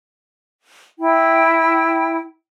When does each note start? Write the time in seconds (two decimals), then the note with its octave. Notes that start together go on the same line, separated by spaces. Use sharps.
0.99 E4 G5